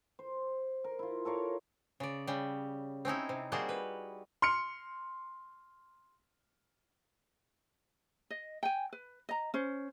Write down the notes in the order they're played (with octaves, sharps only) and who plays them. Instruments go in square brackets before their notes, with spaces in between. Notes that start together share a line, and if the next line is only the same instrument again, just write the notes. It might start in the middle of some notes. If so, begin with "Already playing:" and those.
[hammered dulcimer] C5
A#4
E4 F4
A4 A#4 C#5 F5
[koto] C#3 D5
C#3 G3
C4 C#4 D#4 E4
C3
G3 A#3 F#4 G#4 C5 A5
B4
[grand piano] C6 F6 C#7
[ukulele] D#5
G5 G#5
B4
D#5 A#5
C#4 C5